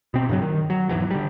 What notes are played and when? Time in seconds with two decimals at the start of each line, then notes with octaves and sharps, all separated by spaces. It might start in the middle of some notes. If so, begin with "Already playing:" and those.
0.14 B2 C4
0.29 G2 C#3 E3 F#3
0.42 D#3
0.70 F#3
0.89 E1 G#2 E3 F#3
1.11 D3 G3